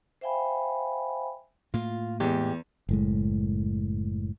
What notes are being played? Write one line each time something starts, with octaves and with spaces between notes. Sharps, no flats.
C5 E5 F5 G5 G#5 B5
A2 A#3 F4
E2 G#3 G4
F#1 A2 G#3